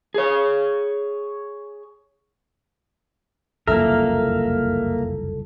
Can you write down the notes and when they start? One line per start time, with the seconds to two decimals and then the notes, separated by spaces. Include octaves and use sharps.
0.14 G#4 C#5
3.67 F#1 C2 F2 A#3 A4 A#4 E5